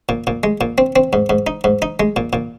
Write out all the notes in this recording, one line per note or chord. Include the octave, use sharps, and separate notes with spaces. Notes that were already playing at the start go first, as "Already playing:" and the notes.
A#2
A#2
G#3
A#2
C4
C4
G#2
G#2
D#4
G#2
D#4
G#3
A#2
A#2